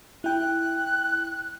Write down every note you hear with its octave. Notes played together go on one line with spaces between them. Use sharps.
E4 G5 F#6